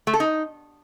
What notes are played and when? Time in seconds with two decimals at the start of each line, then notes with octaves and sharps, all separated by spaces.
0.07 A3
0.14 A4
0.20 D#4